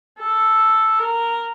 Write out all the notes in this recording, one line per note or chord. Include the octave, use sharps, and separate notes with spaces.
A4
A#4